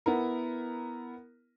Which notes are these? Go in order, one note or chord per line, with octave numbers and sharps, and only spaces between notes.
B3 E4 A#4